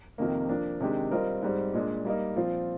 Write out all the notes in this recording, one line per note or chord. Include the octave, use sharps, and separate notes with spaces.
F2 C3 D#3 A#3
F3 A#3 D4
C3 D#3 G#3 D4 G4
G3 C4 F4 A#4 D#5
G#2 G3 C4
A#2 G#3 D4
G3 A#3 D#4
A#2 F3 C4 F4